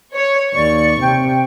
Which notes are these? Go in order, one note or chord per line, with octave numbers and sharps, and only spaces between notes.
C#5
D#2 D5 C#6
C3 G5